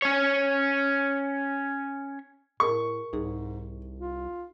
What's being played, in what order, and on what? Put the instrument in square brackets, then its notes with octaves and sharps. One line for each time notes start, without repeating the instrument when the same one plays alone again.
[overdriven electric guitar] C#4 C#5
[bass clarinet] A2 [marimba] G#4 A#4 A5 [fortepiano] C#6
[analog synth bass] C2 [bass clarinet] G#2 [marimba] D#4 G#4
[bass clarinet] F4